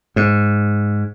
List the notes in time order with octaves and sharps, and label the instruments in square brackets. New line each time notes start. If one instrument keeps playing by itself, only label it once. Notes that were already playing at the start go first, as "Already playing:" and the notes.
[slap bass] G#2